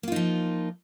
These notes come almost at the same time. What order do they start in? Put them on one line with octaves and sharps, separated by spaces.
A#3 F4 D#4 F3